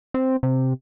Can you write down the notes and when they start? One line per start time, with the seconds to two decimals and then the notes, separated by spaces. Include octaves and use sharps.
0.14 C4
0.43 C3